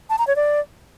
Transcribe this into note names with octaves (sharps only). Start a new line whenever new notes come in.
A5
A#5
C#5
D5